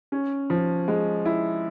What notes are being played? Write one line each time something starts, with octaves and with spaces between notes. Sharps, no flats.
C#4
F3
G#3
E4